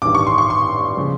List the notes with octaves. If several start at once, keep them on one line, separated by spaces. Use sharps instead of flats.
A1 G2 D#3 G3 D6
C#6
C6
C#6
C6
C#3 F3